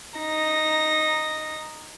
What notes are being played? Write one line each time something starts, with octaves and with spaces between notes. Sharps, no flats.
D#4 A#6